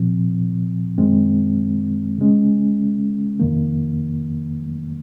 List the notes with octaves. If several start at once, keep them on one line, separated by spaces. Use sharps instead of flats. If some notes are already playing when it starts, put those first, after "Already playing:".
Already playing: A#2 F3 C4
F#2 D#3 G#3 C4
C#3 G#3 C#4
F2 D#3 A#3